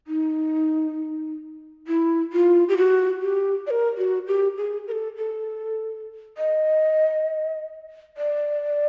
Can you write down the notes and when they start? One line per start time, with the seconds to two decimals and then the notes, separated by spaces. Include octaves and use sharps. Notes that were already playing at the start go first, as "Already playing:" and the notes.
0.07 D#4
1.87 E4
2.33 F4
2.69 G4
2.77 F#4
3.22 G4
3.67 D5
3.70 A#4
3.98 F#4
4.27 G4
4.57 G#4
4.87 A#4
4.92 A4
5.17 A4
6.38 D#5
8.17 D5